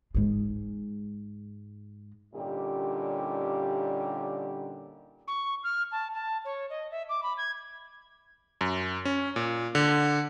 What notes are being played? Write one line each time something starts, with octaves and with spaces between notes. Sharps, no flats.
G#2 G#3
A#2 D3 G3 C#4 D#4 G4
C#6
F6
A5
A5
C#5
D#5
E5
D6
B5
G#6
F#2
C#4
A#2
D3